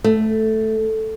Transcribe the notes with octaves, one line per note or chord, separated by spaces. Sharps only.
A3